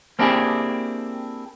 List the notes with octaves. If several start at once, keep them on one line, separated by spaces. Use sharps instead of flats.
A#3 C4 D4 E4 G4 G#4